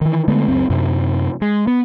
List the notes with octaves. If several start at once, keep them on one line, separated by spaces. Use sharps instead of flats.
D#3 E3
D3 G#3 A3 B3
C#2 F#2 C4
F#2 C3
G#3
B3